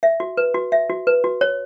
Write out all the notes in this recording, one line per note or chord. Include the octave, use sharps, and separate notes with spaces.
E5
F#4
B4
F#4
E5
F#4
B4
F#4
C#5